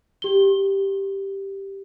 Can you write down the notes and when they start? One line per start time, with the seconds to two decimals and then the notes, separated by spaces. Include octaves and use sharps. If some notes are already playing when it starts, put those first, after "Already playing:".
0.22 G4 G7